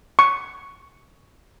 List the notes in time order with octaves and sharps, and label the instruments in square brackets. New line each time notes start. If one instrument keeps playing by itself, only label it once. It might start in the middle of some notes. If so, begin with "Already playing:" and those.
[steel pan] C#6